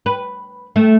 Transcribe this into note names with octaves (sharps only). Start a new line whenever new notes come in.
B4
A3